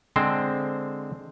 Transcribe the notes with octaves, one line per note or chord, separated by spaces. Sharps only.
D3 G#3 C4 C5